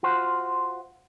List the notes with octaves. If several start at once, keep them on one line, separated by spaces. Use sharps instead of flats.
F4 F#4 C5